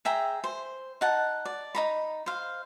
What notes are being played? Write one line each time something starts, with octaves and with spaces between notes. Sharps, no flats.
G#4 E5 G5 A#5
C5
D#4 F#5 A5
D5
D#4 A#5 B5
C5 F5